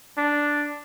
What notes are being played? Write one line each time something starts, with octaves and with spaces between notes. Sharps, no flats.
D4